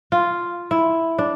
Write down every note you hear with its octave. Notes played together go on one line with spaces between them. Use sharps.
F4
E4
D4